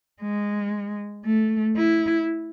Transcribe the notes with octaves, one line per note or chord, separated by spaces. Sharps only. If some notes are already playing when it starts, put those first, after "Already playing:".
G#3
A3
E4